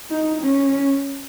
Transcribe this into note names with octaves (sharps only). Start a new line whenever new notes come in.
D#4
C#4